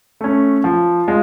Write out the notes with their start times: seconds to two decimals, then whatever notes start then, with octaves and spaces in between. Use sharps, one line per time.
0.21 A3 C#4
0.64 F3
1.08 G#3 F4